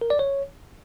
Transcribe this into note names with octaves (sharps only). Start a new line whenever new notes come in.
A#4
D5
C#5